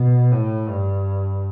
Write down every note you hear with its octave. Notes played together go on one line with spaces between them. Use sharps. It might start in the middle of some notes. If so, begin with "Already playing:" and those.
Already playing: B2
A2
G2